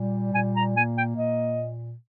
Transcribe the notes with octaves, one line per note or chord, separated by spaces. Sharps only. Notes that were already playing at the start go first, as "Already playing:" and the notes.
Already playing: A#2 G3
A#2 G#5
A#5
A#3 G#5
G5
A#2 D#5